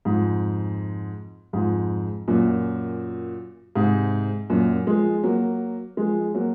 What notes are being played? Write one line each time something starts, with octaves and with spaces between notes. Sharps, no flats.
F2 G#2
F2 G#2
F#2 A#2
G#2 C3
F#2 A#2
F3 G#3
F#3 A#3
F3 G#3
F#3 A#3